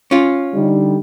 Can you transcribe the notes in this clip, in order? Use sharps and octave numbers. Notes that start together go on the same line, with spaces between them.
C#4 F4
D3 G3 D#4